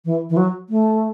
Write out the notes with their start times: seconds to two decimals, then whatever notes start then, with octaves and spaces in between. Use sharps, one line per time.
0.05 E3
0.30 E3
0.37 F#3
0.69 A3